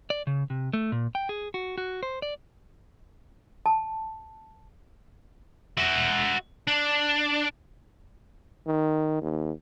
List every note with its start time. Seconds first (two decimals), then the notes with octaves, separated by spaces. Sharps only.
0.10 D5
0.27 C#3
0.50 C3
0.73 A3
0.92 A#2
1.15 G5
1.29 G#4
1.54 F#4
1.78 F#4
2.03 C5
2.22 D5
3.66 A5
5.78 F#4 E5
6.68 D4
8.67 D#3
9.22 D#2